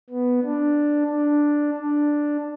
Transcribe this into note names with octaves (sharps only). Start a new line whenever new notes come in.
B3
D4
D4
D4